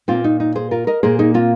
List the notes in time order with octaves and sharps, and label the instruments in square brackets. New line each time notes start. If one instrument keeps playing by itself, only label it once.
[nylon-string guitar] A#2 A#3 C4 F4
D#4
D#4
G#4 C5
F4 A#4
A#4 D#5
A#2 A#3 G#4 C5
D#4 G#4
C4 F4